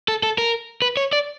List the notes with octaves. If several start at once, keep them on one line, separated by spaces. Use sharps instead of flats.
A4
A4
A#4
B4
C#5
D5